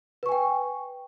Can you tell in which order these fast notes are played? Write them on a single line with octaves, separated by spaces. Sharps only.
B4 C#6 G#5 G5